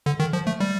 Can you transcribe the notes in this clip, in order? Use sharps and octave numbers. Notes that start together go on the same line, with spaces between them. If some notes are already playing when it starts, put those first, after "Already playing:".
D3
D#3
F3
A3
G3